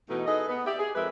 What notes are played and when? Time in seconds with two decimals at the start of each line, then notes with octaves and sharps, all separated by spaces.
0.09 B2 E3 A3 D#4
0.26 D#4 G#4 A4 B4 D#5
0.48 B3
0.66 G4 D5 E5
0.79 G#4
0.95 F2 G#3 C4 A#4 B4 E5